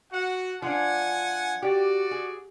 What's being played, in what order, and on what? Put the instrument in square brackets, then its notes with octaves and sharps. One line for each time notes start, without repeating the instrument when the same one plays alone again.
[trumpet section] F#4 F#5
[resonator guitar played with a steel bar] F3 D4 [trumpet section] F#5 G#5
[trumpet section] F#4 D5 [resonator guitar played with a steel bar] G4
[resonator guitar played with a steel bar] G#4